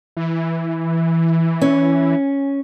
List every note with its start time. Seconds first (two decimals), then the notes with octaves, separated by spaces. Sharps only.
0.17 E3
1.61 C#4